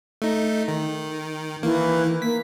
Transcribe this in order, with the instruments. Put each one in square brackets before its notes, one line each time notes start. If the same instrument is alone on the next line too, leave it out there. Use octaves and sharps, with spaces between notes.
[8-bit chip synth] A3 D#4
D#3
[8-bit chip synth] D#3 A#3 [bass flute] E3
[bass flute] A#3 [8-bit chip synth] B6